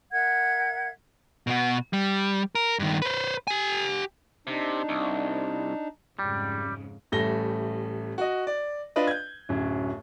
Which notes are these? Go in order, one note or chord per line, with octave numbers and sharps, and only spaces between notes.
A#4 E5 F#5 G#6
B2 F#4
G3
A#4
G2 D#3
B4 C5
G4 G#5
C3 D4 D#4
C2
F2 G#2 C#3 G3
A1 G3 A3 A#6 G7
F#4 D#5
D5
D4 F4 B4 D5 D#5
G6 G#6
D1 F#2